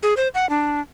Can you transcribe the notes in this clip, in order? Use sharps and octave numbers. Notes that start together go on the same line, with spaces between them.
G#4
C5
F#5
D4